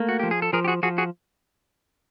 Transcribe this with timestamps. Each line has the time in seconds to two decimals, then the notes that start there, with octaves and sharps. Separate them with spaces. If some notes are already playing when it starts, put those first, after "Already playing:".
Already playing: A3 A#3
0.09 F#4
0.20 F3 G4
0.31 G#4
0.42 A4
0.53 F3 G#4 A#4
0.64 G4
0.68 F#4 G#4
0.83 F3 F#4 G#4
0.98 F#4 G#4